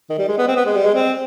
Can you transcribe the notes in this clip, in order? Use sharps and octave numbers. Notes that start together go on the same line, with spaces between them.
D#3
G3
G#3
B3
C4
B3
G#3
G3
G#3
C4